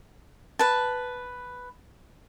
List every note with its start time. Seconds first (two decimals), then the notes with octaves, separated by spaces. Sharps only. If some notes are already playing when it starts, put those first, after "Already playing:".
0.59 B4 A5